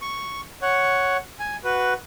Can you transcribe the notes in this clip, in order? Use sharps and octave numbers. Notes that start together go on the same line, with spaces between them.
C#6
C#5 F#5
G#5
F#4 B4